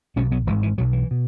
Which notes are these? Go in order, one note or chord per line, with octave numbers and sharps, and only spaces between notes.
B1 B2 G#3 C#4
F#3 B3
G#1 G#2 E3 G#3
E3
B1 B2 F#3
E3
B2